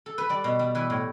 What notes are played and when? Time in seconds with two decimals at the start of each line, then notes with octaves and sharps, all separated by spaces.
0.06 A4
0.18 B4
0.29 G3 D5
0.44 B2
0.59 G3
0.75 E3 B4
0.90 A2